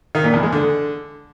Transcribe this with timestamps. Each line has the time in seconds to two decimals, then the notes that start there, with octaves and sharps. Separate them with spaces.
0.15 D#3
0.24 A#2
0.34 E2
0.43 G#3
0.52 D3